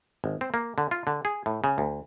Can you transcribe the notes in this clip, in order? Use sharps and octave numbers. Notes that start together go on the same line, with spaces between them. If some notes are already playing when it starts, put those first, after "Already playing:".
G#1
C4
A#3
D3
F4
D3
G#4
A2
C#3
D2